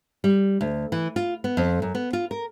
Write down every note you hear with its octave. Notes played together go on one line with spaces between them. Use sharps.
G3
D2
E3
F4
B3
F2
F#2
B3
F4
A#4